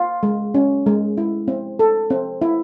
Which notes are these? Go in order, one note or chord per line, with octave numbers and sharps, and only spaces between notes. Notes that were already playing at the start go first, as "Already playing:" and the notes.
Already playing: F4
G#3
C#4
G#3
E4
C4
A4
C4
E4